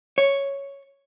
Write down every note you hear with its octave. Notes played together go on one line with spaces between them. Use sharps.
C#5